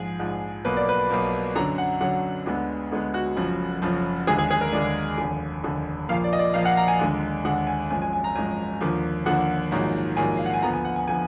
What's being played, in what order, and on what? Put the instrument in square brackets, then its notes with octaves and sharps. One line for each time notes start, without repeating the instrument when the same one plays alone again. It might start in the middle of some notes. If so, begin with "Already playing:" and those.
Already playing: [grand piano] A#1 G#2 F3 G#4
A#1 G#2 F3
B1 B2 A#3 B4
D5
B4
B1 B2 A#3
F#2 D3 F#3 A#5
F#5
F#2 D3 F#3 F#5
D2 D3 G#3 B3
D2 D3 G#3 B3
F#4
F#1 F#2 F3
F#1 F#2 F3
D#2 D3 G#3 G#4
G#4
G#4
A#4
D#2 D3 G#3 D5
F1 D#2 D3 G#5
F1 D#2 D3
A#1 A#2 F3 A#3 F5
D5
D#5
D5
A#1 A#2 F3 A#3 F5
F#5
A#5
G#5
D#2 D3 G#3
D#2 D3 G#3 F#5
G#5
G#1 F#2 F3 G#3 G#5
G#5
G#5
A#5
G#1 F#2 F3 G#3 G#5
D#2 D3 F3 A#3
D#2 D3 F3 A#3 F#5
A#1 G#2 D#3 F#3 A#3
A#1 G#2 D#3 F#3 A#3 G#5
F5
F#5
G#5
D2 D3 F3 B3 A#5
G#5
F#5
G#5
D3 F3 B3 G#5